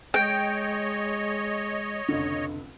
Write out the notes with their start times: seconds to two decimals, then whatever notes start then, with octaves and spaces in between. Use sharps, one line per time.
0.14 G#3 C#5 D#5 G5
2.08 F1 C#2 D3